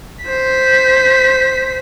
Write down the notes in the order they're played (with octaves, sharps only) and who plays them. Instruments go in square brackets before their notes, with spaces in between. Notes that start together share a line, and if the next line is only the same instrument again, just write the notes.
[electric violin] C5 B6